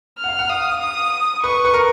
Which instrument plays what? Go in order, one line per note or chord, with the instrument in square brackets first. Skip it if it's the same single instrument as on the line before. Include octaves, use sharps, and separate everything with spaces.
[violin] F6
[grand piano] F#5
F5
F#5
[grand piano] F5 [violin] D#6
[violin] D#6
[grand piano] B4 [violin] C#6
[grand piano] B4
A#4